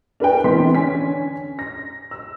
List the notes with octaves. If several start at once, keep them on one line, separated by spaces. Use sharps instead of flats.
D4 A#4 B4 G5
A#1 E3 B3 C4 C6 B6
D3 C#4 G#5 B6
A#6
E6